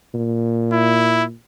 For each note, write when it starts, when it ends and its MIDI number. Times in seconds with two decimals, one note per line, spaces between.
0.14 1.33 46
0.72 1.24 64